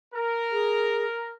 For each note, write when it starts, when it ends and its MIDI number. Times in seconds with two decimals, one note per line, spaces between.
0.13 1.31 70
0.52 1.06 68